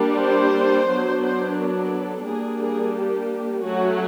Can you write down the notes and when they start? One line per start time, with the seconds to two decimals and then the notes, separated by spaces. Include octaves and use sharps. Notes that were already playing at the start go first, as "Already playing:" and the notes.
Already playing: G3 A#3 D4
0.18 C5
0.88 F#3 B3 D4
1.22 C5
1.56 A#4
1.91 A4
2.25 G3 A#3 D4 G#4
2.60 G#4
2.94 G4
3.63 F#3 A3 C#4 F#4